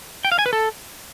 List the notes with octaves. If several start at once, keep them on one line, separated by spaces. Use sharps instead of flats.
G5
F5
G#5
B4
A4